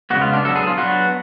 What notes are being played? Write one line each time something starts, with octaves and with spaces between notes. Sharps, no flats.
C#3 G#3 B3 F#4
F4
D4
F#3 B3 D4 A4
G#4
F4
F#3 B3 D4 F#4